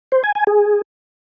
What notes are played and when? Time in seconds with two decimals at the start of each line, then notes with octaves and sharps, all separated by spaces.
0.12 C5
0.24 G#5
0.35 G#5
0.47 G#4